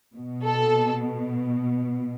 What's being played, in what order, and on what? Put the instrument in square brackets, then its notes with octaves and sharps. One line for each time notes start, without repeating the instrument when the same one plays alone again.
[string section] B2
A4